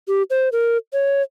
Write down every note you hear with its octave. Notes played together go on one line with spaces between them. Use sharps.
G4
C5
A#4
C#5